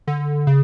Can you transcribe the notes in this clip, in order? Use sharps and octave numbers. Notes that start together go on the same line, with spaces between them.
D3
C#3